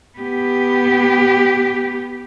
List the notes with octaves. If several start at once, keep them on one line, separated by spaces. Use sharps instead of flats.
B3 G4